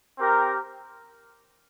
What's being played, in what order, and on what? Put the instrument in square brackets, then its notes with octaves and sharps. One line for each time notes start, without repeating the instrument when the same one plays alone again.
[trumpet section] C4 G4 A#4